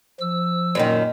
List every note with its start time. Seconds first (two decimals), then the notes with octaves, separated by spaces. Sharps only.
0.20 F3 E6
0.75 F#2 A#2 D#3